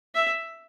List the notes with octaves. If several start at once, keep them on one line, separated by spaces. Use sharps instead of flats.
E5